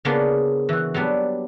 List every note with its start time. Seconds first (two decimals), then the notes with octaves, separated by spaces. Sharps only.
0.05 C#3 A#3 B3 D4 F4 G#4
0.69 E3 F#4
0.94 F#3 G3 B3 D4